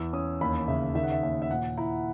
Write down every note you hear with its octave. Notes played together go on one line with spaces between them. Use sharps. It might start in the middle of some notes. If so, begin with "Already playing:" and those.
Already playing: E2 E6
C#4 D#6
D#2 B5
C#3 E5
D#3 E5
F#5
E5
D#2 E5
E5
A#2 F#5
E4 A#5